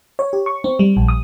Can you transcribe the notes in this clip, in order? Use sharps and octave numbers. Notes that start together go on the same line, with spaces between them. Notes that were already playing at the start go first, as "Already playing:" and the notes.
C#5
G4
C#6
C4
G3
A#1
D#6